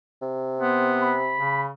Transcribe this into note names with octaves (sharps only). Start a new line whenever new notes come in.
C3
B3 C5
B5
C#3